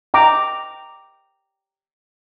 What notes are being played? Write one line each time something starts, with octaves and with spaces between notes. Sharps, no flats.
G5 A#5 D6